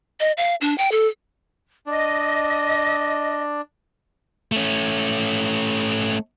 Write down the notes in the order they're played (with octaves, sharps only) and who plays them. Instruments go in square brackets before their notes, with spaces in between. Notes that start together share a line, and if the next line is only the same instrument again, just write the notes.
[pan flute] D#5
F5
D4
G5
A4
[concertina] D4 [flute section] D#5
[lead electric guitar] A3 C#4